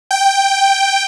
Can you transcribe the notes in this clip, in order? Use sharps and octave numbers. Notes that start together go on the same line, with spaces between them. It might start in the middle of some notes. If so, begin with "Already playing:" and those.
G5